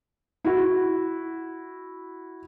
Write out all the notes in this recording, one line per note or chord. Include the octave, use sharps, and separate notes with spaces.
E4 F#4